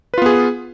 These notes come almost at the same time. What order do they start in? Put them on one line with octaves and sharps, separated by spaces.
B4 F4 B3 G#4